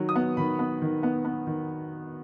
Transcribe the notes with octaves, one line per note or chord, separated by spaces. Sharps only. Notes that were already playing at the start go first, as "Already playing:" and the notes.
Already playing: D#3 F#3
D#6
B3
D#3 B5
B3
D#3
B3
B3
D#3